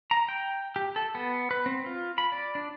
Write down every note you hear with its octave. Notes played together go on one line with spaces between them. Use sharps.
A#5
G5
G4
A4
B3
B4
C4
F4
B5
D5
D4